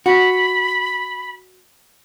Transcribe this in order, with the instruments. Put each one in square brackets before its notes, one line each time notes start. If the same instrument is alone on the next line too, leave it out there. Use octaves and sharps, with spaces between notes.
[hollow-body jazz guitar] F#4 [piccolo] B5